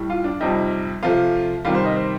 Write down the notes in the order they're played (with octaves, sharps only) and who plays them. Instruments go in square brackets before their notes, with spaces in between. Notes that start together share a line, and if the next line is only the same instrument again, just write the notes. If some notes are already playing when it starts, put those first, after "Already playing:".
Already playing: [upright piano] A2 G3
F4
D4
F2 C3 G3 D#4
C3 F3 A3 F4
C3 D#3 G3 F4
C5
D#5
C5